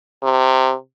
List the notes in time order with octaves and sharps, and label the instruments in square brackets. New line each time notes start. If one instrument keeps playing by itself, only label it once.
[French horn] C3